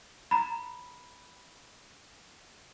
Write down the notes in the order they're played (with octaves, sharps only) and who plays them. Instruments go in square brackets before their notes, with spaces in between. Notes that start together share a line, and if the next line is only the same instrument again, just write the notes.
[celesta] A#5 B5